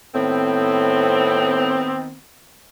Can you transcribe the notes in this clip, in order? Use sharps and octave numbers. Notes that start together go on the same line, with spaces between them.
A2 D#3 B3 C4